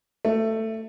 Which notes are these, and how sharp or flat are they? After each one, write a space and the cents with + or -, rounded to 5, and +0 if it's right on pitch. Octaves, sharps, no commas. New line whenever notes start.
A3 +15